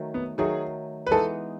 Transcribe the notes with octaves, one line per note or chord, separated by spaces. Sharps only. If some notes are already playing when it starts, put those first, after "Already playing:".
Already playing: D#3 F#3 A3
B3
D#3 F#3 A3 G#4
B4
E3 G#3 B3 D#4 A4